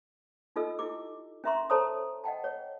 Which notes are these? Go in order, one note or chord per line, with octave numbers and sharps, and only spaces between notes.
D#4 F4 A4 D#5 E6
E4 G4 D6
C#4 A#4 E5 A#5 C6 C#6
A4 C5 C#5 A5 A#5 D#6
D#5 F#5 G5 A5
C#5